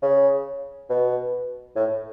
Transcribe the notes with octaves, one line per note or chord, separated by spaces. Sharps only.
C#3
B2
A2